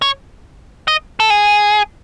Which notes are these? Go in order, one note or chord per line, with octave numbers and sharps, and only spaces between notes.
C#5
D#5
A4
G#4